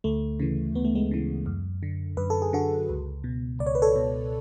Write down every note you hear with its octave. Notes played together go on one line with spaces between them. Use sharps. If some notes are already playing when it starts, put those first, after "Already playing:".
D2 A3
C#3 E3
D2 B3
A3
G#3 B3
C#3 E3
F#2
D3
F#2 B4
A4
G#4
D3 F#4 A4
C#2
B2
C#2 D5
C#5
B4
A4 C#5
B2